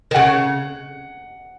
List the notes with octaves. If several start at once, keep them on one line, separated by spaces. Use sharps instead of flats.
D#3
C#3 F#5